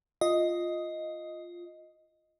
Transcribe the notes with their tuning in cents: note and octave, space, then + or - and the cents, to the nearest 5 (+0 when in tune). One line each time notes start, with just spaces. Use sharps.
F4 +0 D#5 +5